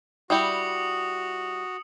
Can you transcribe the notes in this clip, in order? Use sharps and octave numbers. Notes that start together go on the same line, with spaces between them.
G3 E4 F#4 G4 D#6 C#7 F#7